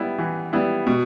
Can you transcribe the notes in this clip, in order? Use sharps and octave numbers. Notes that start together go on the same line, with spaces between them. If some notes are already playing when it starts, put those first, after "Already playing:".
Already playing: G3 B3 E4
E3
G3 B3 E4
B2